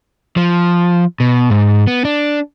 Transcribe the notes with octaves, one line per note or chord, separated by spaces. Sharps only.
F3
B2
G#2
B3
D4